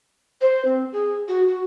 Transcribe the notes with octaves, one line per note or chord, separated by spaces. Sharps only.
C5
C4
G#4
F#4
F#4